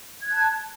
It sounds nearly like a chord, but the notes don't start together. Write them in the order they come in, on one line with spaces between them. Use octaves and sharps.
G#6 F#6 A5